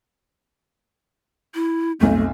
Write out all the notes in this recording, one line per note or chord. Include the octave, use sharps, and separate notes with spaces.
E4
F1 B1 A3